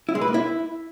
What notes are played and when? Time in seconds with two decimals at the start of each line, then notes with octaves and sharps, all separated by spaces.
0.09 E4
0.15 G#3
0.21 B4
0.28 A#3
0.34 E4